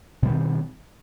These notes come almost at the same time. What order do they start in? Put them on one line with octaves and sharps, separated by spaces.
B2 G3 D#3 C4